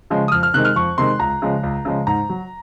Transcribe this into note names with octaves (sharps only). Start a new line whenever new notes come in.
C#3 F3 G#3
D#6
F2 F6
F6
C3 D#3 G#3 F#6
F6
F2 C#6
C3 D#3 G#3 C6
C#2 A#5
C#3 F3 G#3
C#2
C#3 F3 G#3
G#2 A#5
F#3